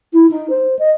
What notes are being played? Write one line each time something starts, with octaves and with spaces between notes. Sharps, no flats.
E4
D#4
C5
D#5